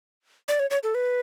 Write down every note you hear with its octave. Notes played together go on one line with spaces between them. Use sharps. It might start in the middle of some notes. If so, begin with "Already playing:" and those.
D5
C#5
C#5
A4
B4